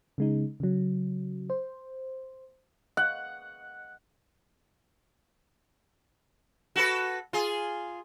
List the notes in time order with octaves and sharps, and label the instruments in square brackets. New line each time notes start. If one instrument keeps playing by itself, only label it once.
[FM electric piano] C#3 G#3 D#4
C#3 F#3
C5
[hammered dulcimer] F#5
[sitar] F#4 A4 B4
F4 G#4